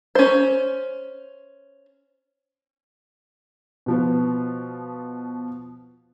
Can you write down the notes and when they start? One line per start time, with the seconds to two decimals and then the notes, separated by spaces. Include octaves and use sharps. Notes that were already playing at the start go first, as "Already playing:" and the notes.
0.15 C#4 C5
3.86 B2 F3 B3